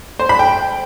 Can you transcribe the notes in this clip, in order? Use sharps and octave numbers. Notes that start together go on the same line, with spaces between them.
C5
B5
G5